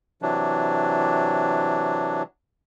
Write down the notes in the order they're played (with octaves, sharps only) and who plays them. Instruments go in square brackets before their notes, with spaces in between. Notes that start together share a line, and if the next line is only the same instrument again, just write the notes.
[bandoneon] C3 E3 F#3 D4